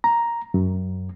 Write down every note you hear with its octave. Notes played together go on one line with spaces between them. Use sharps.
A#5
F#2